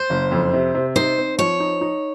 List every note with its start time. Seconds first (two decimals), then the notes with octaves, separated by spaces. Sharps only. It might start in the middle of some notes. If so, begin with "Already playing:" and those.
Already playing: C5
0.10 F#1
0.31 F2
0.53 C3
0.75 C3
0.96 D#4 C5
1.18 C4
1.38 F3 C#5
1.60 D#4
1.81 D#4